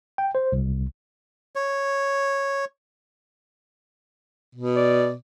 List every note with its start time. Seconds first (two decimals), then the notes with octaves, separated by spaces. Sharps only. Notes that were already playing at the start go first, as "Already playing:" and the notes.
0.18 G5
0.35 C5
0.52 C2
1.56 C#5
4.55 B2
4.76 D5